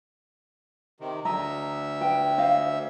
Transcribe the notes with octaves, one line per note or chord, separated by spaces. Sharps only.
C3 D#3
D2 D#5 E5 A#5
B4 G5
C5 D#5 F5